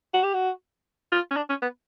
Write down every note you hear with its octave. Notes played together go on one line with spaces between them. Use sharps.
F#4
G4
F#4
F4
C#4
D4
C#4
B3